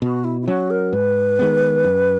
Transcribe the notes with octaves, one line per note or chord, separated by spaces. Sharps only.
B2 F#4
E4
E4
F#3 C#4 F#4
A#4
G#2 B4
D#3 G#3 B3
F#2